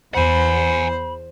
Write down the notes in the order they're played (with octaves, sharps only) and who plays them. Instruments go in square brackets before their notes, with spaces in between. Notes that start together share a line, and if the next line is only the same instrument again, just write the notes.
[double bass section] E2 [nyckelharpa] C5 [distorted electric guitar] F#5 G#5 [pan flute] B5